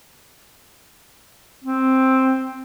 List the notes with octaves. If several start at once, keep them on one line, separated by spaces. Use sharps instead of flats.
C4